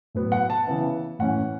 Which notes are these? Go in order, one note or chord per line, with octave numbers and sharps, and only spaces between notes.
A2 F#3 B3
F#5
A5
C#3 E3 B3 E4
A2 E3 C#4 F#5